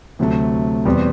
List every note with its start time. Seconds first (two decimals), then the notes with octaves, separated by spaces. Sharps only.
0.19 D2 C3 F#3 A3
0.85 E2 B2 G3 C4